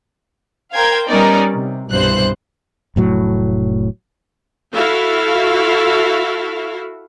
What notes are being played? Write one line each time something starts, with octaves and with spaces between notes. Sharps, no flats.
A#4 C5 F5 G5 G#6
G3 B3 C#4 D#4 A#4 D5
C3
C2 G2 B2 E3 C5 F#6
F1 A2 F#3
E4 F#4 A4 E5 F5